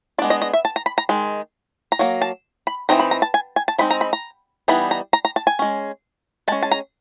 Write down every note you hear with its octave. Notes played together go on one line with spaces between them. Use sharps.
G#3 B3 D4 D5
D#5
D#5
E5
A5
A#5
B5
A#5
D#3 G#3
A#5
F#3 A#3
A5
B5
E3 G#3 C4 D#4 A#5
B5
A#5
A5
G#5
G#5
A5
F3 G#3 C4 D#4 B5
A#5
B5
A#5
E3 G3 B3 D#4 B5
A#5
A#5
A#5
A5
G#5
G#3 C#4
G#3 C#4 A5
A5
A#5